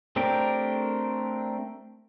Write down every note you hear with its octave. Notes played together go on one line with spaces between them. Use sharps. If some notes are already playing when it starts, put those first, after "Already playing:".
A3 C4 D4 G4 A#4